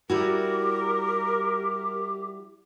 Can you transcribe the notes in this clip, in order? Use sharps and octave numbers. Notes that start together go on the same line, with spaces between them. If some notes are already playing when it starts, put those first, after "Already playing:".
G3 E4 F#4 G4 A#4